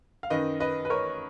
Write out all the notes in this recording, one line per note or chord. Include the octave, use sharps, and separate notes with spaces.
F5
F#2 D#3 B4 D#5
B4 D#5
B4
A#4 C#5